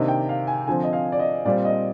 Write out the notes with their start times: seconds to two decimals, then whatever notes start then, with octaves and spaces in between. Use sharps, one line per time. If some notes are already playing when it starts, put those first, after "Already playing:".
Already playing: C3 D#3 A#3 D4 D#5
0.08 G5
0.29 F5
0.47 G#5
0.67 D3 F3 C4 G#5
0.84 D#5
0.93 F5
1.12 D5
1.19 D#5
1.45 A#2 G3 C4 D5
1.65 D#5